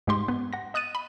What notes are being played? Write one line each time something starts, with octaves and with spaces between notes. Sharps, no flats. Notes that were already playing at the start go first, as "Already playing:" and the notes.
G#2 G#3 G4 C6
B3
F#5 A#6
D#5 D#6 F#6 A6 D#7
B5